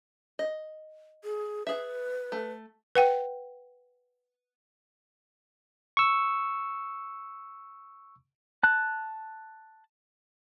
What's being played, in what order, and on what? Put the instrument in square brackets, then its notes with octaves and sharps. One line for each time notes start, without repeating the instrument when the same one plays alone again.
[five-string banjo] D#5
[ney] G#4
[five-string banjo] G#4 E5 [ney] B4
[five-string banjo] A3
[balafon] B4 F#5 G5
[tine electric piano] C#6 E6
[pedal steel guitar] A5 F#6